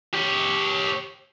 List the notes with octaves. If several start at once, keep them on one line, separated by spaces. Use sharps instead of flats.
G4 C#5